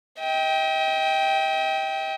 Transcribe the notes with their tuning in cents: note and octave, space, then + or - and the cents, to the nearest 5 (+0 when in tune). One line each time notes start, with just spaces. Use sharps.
D#5 +45 G5 +0